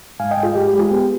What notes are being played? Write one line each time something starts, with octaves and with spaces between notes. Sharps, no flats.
G#2 F5 G#5
D#5 G5
G#2
F4 G#4
G#2 G4
G4
G#3
F4 G#4
B3 G4